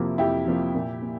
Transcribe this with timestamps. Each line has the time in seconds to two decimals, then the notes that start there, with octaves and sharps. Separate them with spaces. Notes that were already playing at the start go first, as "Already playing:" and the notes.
Already playing: F2 C3 F3 A#3 E4
0.18 F2 E4 G4
0.46 C3 F3 A#3
0.75 A#2
1.02 A#3